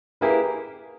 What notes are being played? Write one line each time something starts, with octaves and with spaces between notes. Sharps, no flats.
A#3 E4 G4 G#4 A#4 B4